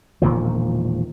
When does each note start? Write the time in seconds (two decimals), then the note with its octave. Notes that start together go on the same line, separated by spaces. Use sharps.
0.22 E1 A#2 D#3 F3